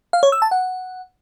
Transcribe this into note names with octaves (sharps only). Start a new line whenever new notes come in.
F5
C#5
E6
A5
F#5